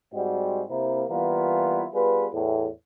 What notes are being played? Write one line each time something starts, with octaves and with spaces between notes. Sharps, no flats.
G#2 G3 G#3 C4 F#4
C3 A#3 E4
E3 G3 A#3 B3 E4 F4
G3 B3 F4 G#4 B4
E2 A2